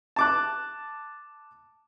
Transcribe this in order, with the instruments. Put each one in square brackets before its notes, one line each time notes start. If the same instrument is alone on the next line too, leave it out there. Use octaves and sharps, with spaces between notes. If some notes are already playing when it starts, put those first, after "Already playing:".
[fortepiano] A5 D6 F#6